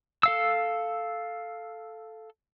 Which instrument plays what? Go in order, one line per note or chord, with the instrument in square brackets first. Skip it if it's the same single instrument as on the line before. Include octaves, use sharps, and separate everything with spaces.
[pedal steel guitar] A4 F5 E6